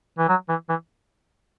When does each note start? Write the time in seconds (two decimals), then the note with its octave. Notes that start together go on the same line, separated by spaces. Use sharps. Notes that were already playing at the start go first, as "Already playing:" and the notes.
0.19 E3
0.29 F#3
0.49 E3
0.69 E3